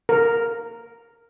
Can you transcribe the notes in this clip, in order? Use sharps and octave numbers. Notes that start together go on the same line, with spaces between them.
A#4